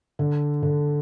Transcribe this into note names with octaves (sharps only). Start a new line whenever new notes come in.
D3
D3